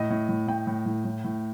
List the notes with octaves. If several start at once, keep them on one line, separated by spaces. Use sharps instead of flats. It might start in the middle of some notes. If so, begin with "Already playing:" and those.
Already playing: A2 D#5
A2
A2
A2 G5
A2
A2
A2
A2